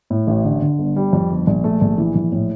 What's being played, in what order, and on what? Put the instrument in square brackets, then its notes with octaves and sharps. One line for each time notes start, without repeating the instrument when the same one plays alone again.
[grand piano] A2
A1
D3
D3
G1
G3
F2
G1
A#1
A3
A#1
E3
A#1
A2